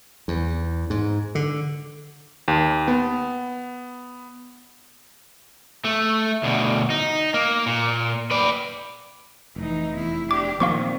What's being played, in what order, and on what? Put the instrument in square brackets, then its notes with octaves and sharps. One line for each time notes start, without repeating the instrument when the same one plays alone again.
[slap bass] E2
G#2
D3
[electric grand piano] D#2
B3
[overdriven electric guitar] A3
D2 B2
D#4
A#3
A#2
B4 D5
[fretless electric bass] F1 [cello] E3 D#4
[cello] E2 E4
[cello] D4 G4 [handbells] D6
[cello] A#2 D#3 [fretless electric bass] F3 A#3 C4 [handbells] F5 C#6 D6